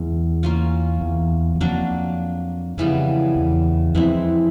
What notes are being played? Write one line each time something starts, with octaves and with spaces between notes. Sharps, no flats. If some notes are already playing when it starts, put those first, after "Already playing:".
Already playing: E2 E3 G#3 C#4
A#3 C#4 F4
E2
E2
F2 F#3 A#3 D4
F2 C#3 E3 G3 B3
E2
F2 E3 G#3 C4 E4